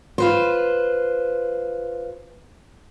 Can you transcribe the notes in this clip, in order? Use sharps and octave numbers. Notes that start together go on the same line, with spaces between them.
F4 B4 C5